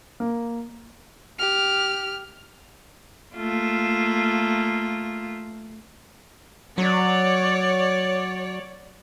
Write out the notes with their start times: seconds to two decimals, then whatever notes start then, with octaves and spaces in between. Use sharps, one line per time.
0.20 A#3
1.39 G4 F6
3.36 A3 A#3 F4
6.78 F#3 C#5 D5